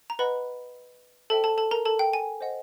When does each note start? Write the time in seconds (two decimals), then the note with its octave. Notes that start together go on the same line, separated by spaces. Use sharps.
0.10 A#5
0.19 B4 D#5 F#5 B5
1.30 A4 C5 E5 G5 A5
1.44 A4 A5
1.58 A4 A5
1.71 A#4 A#5
1.85 A4 A5
1.99 G5
2.13 G#5
2.41 C5 D#5 F#5